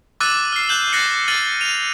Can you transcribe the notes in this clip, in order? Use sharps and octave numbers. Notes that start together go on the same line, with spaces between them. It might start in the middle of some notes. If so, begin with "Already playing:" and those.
D6 E6 F#6 A6 D#7
F6 C7
F#6 G6 E7 F#7
F#6 A6 A#6 C7 C#7 F#7
F6 A6 D#7 F#7
D#7 F7